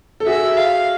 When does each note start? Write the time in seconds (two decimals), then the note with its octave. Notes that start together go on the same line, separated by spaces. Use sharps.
0.20 A4
0.26 F#4 G#4 E5
0.57 F5